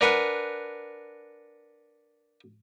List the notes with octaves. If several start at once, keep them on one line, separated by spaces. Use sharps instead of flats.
D4 A#4 B4 F#5 G#5